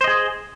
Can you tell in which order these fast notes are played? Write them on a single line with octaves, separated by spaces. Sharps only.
C5 D#5 G#4